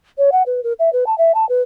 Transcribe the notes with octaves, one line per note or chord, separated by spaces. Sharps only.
C#5
F#5
B4
A#4
E5
B4
A5
E5
A5
B4